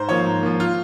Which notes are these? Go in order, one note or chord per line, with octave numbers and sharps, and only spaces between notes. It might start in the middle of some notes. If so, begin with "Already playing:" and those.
Already playing: G#2 C5
F3 A#3 C#5
G#2
F3 A#3
F4